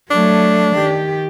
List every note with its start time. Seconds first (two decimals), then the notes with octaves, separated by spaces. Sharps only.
0.11 F#3 A3 D4
0.76 D#3 G4